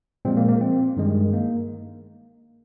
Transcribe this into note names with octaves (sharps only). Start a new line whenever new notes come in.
A#2 F3 G#3 C4
A#3
A#3
C4
G2 D#3 G#3
A#3